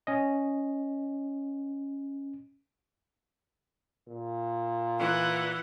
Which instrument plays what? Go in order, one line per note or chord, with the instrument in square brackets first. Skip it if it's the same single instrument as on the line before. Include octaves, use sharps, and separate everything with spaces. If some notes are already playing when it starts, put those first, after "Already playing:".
[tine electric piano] C#4 D#5
[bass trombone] A#2
[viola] E3 F#5